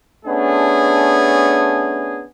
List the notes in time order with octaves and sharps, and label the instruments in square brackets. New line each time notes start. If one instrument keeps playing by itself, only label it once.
[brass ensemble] A3 B3 C#4 D4 G#4